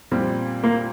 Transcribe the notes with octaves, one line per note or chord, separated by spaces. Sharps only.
A#2 G3 C4
A#3